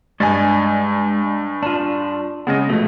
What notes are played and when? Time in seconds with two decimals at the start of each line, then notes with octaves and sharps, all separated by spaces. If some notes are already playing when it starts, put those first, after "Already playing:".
0.20 G2 G#3 D5 D#5 G#5
1.63 D4 F4
2.47 C#3 G#3 B3 D#5
2.69 B2 F3 A3